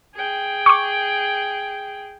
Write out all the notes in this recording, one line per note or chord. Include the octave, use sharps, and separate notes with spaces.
G#4 G5
C#6 D6